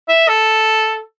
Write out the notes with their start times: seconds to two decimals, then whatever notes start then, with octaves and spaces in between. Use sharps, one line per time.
0.09 E5
0.28 A4